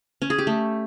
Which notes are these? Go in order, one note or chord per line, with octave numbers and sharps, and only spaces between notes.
C#4
G#4
G4
A3